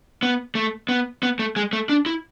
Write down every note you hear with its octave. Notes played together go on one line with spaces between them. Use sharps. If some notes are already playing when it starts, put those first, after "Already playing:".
B3
A3
B3
B3
A3
G#3
A3
D4
E4